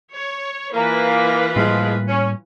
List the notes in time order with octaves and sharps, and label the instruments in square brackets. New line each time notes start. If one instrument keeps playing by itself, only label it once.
[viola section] C#5
[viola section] E3 F4 B4 [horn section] A#3
[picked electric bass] A2 G3 A#3 [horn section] F3 G#3
[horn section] C#4